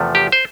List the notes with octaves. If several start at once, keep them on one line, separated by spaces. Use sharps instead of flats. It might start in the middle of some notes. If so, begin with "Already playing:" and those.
Already playing: E2 C3 F3 A3
G4
C5